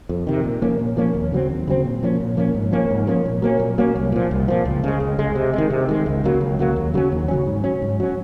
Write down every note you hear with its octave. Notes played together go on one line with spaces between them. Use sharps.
F2
C3 D#3
A#2
F3 A#3 C#4
A#2
F3 A#3 C#4
D#2
C#3 F#3 C4
D#2
C#3 F#3 C4
A#2
F3 A#3 C#4
A#2
F3 A#3 C#4
G#2
F3 A#3 C#4
G#2
F3 A#3 C#4
A#2
F#3 A#3 C#4
A#2
F#3 A#3 C#4
C2
A#2 F3
C2
A#2 F3
C#2
C#3 G#3
C#2
C#3 G#3
C3
D#3 G#3
C3
D#3 G#3
C#2
C#3 F#3 A#3
C#2
C#3 F#3 A#3
D#2
C#3 F#3 C#4
D#2
C#3 F#3 C#4
G#2
F#3 C#4
G#2
F#3 C#4